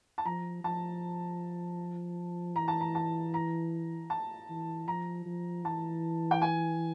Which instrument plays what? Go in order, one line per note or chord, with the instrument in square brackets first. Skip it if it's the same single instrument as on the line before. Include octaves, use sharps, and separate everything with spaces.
[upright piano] A5
[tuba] F3 [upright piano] A#5
[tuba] F3 [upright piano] A5
[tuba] E3 [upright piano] A#5
[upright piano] A5
A#5
A5
A#5
A5
[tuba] E3
[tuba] F3 [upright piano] A#5
[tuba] F3
[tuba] E3 [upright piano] A5
[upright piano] G5
G#5